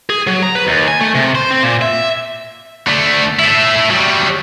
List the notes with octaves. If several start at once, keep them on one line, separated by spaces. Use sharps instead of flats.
G#4
F#3
A#5
B4
D#2
G#5
A3
C3
C5
C4
A#2
E5
D3 A3
A3 E4
F#3 G3